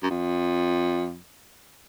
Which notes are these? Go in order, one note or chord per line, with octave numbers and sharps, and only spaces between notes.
F#2
F2